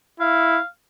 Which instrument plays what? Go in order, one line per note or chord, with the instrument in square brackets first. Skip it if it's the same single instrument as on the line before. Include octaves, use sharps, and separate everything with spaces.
[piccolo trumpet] E4 [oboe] F5